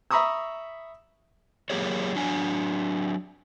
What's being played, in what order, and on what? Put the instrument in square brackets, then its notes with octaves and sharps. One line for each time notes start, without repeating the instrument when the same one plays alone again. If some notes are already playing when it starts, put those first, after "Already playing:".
[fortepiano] E5 A#5 B5 C#6 D#6 E6
[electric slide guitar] F#3 A#3 G4 G#4 A#4 C#5
F#3 D4 G#5